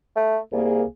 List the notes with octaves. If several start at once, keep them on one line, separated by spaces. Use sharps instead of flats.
A3
C2 A#3 G#4